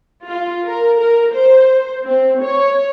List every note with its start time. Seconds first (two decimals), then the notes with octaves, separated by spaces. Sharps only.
0.26 F4
0.66 A#4
0.99 A#4
1.34 C5
2.04 C4
2.42 C#5